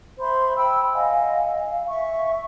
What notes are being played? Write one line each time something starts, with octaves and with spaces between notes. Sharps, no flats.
C5 E5 B5 C6
G5 B5 E6
D#5 F5 F#5 G#5
F5
E5 C#6